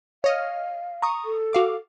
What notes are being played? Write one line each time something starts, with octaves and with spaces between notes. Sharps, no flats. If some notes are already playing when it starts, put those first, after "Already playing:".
C#5 D#5 F5 F6
A#5 C#6 D#6
A4
F#4 F5 D6